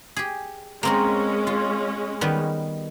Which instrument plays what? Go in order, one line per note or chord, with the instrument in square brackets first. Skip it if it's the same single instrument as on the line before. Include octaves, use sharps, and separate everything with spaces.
[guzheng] G4 G#4
[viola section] G#3 C#4 [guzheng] A#3 C4 A#4
[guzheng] F4
D#3 G3 B3